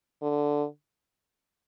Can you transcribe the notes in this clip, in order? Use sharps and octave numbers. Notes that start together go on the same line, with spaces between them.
D3